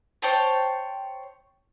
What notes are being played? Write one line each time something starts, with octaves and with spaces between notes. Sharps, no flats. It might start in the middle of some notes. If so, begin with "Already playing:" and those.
C5 C#5 G5 A5